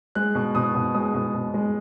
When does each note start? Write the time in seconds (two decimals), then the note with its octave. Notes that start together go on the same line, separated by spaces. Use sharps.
0.15 G#3 F#6
0.35 B2
0.55 B2 D#6
0.75 B2
0.95 G#3 D#6
1.15 B2
1.34 B2
1.54 G#3